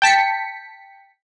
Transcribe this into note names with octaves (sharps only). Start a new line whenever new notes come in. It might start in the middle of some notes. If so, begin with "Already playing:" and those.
G5 A5 B6 C#7